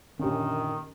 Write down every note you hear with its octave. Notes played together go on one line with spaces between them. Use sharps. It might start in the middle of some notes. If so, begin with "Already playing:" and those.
F#2 A#2 D3 D#3 C#4 D#4 G4